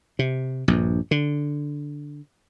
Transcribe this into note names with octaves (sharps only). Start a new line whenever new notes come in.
C3
A#1 G2
D3